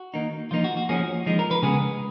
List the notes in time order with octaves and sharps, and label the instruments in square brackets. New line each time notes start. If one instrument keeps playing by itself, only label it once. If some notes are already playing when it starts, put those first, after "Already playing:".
Already playing: [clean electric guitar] F#4
D#3 A#3 D#4
F3 A#3 D#4 F4
F#4
F#4
F3 A#3 C#4 G#4
F3 G#3 D#4
A#4
B4
C#3 G#3 B3 G#4